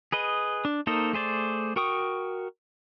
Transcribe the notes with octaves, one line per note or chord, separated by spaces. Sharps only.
G#4 B4 D#5
D4
A#3 D#4 A4 C5 D#5
A3 G#4 C5 D5
F#4 A#4 G5 C#6 D#6